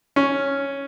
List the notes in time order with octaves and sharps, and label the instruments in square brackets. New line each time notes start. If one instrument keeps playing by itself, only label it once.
[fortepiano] C#4